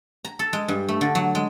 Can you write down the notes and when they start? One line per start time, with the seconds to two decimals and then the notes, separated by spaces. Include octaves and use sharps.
0.25 A#5
0.39 A4
0.53 G#3
0.68 G2
0.88 A3
1.01 D3
1.15 F#3
1.35 G#3